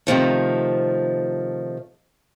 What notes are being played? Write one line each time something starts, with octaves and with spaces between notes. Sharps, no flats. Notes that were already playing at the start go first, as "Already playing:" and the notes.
C3 D#3 F3 A3